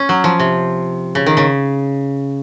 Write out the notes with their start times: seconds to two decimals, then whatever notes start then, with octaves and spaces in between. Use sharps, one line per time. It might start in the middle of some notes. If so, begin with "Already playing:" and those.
Already playing: C#4
0.09 F#3
0.24 F3
0.39 C3
1.15 C#3
1.26 D#3
1.37 C#3